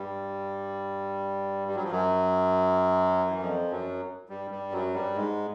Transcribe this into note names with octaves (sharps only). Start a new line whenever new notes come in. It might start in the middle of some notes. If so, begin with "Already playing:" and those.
Already playing: G2 G3
G3
F#3
F3
F#2 F#3
E3
F2 F3
F#2 F#3
G2 G3
G2 G3
F#2 F#3
G2 G3
G#2 G#3